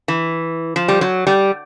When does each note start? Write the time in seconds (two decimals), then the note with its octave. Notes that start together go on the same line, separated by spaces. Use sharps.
0.08 E3
0.76 F3
0.88 G3
1.01 F#3
1.27 G3